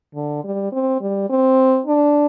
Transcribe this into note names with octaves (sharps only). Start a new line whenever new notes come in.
D3
G3
C4
G3
C4
D4